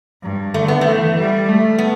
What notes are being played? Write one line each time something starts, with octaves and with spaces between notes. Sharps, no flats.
G2
D3 A3
B3
E3 A3
G3
A3
B3